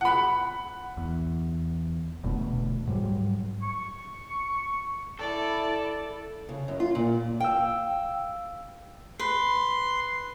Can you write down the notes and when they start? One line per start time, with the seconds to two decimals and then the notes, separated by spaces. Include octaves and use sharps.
0.01 F#5 B5
0.97 E2
2.23 E1 D2 B2 A3
2.87 G#2 F#3 G3
3.63 C#6
5.19 E4 A4 D5
6.49 C#3
6.68 F#2
6.80 F4
6.95 A#2
7.40 F5 G5 E6
9.19 B4 C6